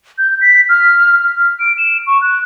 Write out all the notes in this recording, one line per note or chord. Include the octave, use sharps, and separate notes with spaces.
G6
B6
F6
F6
D7
E7
C#6
F#6